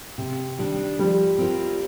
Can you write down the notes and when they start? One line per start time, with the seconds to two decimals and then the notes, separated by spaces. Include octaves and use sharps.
0.18 C3
0.59 D#3 G3 D4
0.99 F3 G3
1.38 C4 F4 A#4